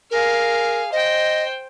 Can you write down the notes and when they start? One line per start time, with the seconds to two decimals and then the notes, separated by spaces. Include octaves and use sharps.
0.11 G#4 A#4 F5
0.92 C5 D#5 G5